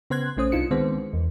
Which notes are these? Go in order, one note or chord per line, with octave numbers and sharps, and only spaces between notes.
C#3 B3 C5 C6 F#6 G#6
A#1 A3 C#4 C5 D#6
C2 D4 D#4 F4 C#7
D#3 G#3 B3 C4 C5
E2